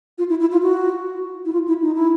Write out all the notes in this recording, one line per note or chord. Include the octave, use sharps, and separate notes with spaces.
F4
E4
E4
F4
F#4
E4
F4
E4
D#4
E4